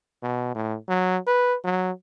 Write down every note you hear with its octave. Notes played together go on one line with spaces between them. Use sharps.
B2
A2
F#3
B4
F#3